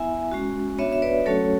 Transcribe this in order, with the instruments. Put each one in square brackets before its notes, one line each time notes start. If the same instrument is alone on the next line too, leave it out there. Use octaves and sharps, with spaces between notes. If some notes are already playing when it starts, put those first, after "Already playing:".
Already playing: [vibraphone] B3 E4 E5 G#5
G#3 C#4 F#4
B3 D4 F#4 C#5 E5
E5
B4 D5
F#3 A3 C#4 F#4 A4 C#5